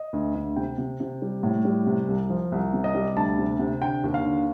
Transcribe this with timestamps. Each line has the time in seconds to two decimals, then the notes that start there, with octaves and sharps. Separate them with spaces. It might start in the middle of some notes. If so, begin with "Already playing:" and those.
Already playing: D#5
0.13 D2
0.35 D2
0.56 C3 G5
0.78 C3
1.00 C3
1.22 G3
1.43 A2
1.65 G3
1.86 C3
2.08 C2
2.30 F3
2.52 C2
2.73 C3
2.84 D#5
2.95 G3
3.16 D2 A5
3.38 C3
3.59 C3
3.82 D3 G5
4.04 D#2
4.14 F5
4.25 D3